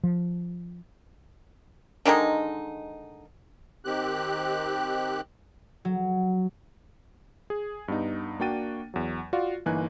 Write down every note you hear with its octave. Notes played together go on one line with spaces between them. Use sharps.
F3
D3 D#3 G#3 D#4
D#3 C4 G4 F#6
F#3
G#4
G2 B3 D#4
A#3 D4 F#4 G5 A6 D#7
E2 F#3
F4 F#4 D5 F5
G1 E3 A#3 D#4 G#5 F#6